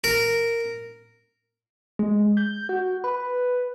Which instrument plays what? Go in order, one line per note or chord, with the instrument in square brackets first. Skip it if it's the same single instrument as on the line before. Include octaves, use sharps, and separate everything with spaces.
[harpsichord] A#4
[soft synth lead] G#3
G6
F#4
B4